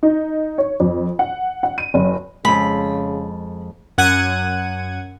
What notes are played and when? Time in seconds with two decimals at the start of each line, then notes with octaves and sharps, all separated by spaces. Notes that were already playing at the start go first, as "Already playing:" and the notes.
0.03 D#4
0.58 C#5
0.80 F2
1.19 F#5
1.63 F#5
1.78 D#7
1.94 F#1
2.45 F2 C#3 G#3 B5
3.98 F#2 F#5 G#6 D#7